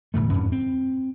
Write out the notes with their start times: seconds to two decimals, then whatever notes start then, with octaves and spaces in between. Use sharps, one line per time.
0.14 E1 A2 D3 A3
0.30 F2 G#2 C#4
0.52 C4